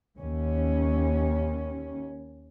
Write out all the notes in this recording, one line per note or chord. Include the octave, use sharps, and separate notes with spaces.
D#2 C#4